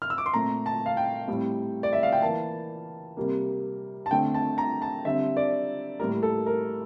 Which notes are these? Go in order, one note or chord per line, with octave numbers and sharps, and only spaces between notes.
F6
E6
D6
C6
A#2 A3 C4 A#5
A5
F5
G5
A2 G3 C4
D5
E5
F5
G5
E3 A#3 A5
C3 G3 A#3
A5
D3 A3 C4 G5
A5
A#5
A5
D3 G3 C4 E5
D5
A2 G3 A#3 A#4
A4
A#4